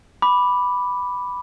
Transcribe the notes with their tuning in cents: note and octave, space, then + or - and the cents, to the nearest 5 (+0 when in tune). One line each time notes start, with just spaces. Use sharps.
B5 +0 D6 +0